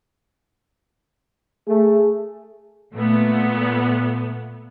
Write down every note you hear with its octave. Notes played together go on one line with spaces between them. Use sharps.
A3 G#4
A#2 A3 B3